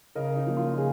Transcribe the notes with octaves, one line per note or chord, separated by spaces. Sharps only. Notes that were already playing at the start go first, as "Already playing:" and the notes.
C#3 A#4 D#5
D#4
F3 A#3
F4
C#3 G#4